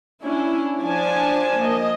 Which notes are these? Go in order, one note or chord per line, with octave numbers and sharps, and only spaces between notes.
C#4 D4 E4
F3 D4 G#5 A5
A#3 D#5